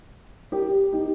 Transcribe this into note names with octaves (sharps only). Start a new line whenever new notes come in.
G4 A#4
D#4 G4